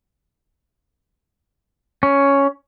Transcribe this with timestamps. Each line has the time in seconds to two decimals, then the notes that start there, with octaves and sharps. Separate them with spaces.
2.03 C#4